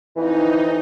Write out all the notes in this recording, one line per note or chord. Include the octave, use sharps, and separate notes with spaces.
F2 E3 D#4